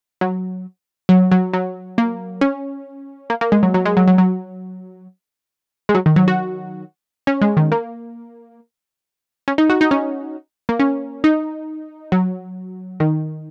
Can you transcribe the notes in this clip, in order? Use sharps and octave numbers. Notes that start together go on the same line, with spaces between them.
F#3
F#3
F#3
F#3
A#3
C#4
A#3
A#3
G#3
F#3
F#3
G#3
F#3
F#3
F#3
G#3
F#3
D#3
F#3
F#4
C#4
G#3
D#3
A#3
C#4
D#4
F#4
D#4
C#4
A#3
C#4
D#4
F#3
D#3